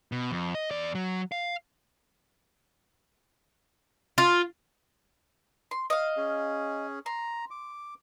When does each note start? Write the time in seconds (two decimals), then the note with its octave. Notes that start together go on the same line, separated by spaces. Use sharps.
0.12 B2
0.31 F2
0.55 D#5
0.71 E2 D5
0.95 F#3
1.32 F5
4.18 F4
5.71 C6
5.90 D#5 F5
6.17 C#4 G#4
7.06 A#5 C6
7.51 D6